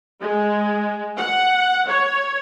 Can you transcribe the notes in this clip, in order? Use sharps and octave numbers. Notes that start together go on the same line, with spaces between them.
G#3
F#5
C#5